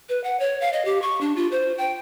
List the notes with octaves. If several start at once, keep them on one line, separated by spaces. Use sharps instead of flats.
B4
F#5
C#5
F5
D#5
G4
C#6
D4
F4
C5
G5